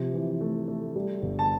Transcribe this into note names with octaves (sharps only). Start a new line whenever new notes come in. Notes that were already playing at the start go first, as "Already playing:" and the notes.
Already playing: C3 F3
E3
A3
A3
G3
G1
A5